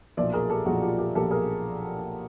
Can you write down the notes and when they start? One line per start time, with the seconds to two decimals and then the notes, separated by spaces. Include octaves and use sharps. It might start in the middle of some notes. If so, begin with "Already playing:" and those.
0.17 B1 A#2 F3 D5 E5
0.33 G#4 A#4
0.50 G4 A4
0.66 B1 A#2 F3 F#4 G#4
0.82 F4 G4
0.98 G4 A4
1.15 B1 A#2 F3 G4 A4
1.31 G#4 A#4